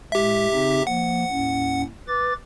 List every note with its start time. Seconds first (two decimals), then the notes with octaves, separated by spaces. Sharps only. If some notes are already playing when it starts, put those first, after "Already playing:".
0.12 A2 G#3 G4 E5
0.52 C#3 C4 D#4
0.87 F3 A#3 F#5
1.30 D#2 A2 C#4
2.08 B4 D6 A6